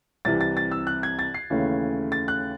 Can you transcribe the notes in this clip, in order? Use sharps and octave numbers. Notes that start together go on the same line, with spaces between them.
C2 C3 E3 A6
A6
A6
E6
F#6
G#6
A6
C7
D#2 C#3 E3 A3 C#4
A6
F#6